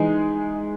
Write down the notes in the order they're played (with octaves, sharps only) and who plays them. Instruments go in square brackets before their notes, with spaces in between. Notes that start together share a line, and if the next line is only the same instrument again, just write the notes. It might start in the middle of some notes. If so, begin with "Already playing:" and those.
Already playing: [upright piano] E3 G#3 D#4 G#4